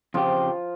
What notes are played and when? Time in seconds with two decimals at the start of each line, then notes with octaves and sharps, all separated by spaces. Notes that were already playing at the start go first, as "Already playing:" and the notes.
0.14 F2 C#3 F3 F4 G4